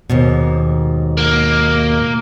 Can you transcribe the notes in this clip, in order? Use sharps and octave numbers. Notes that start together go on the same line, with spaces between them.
D#2 G#2 B2
A#3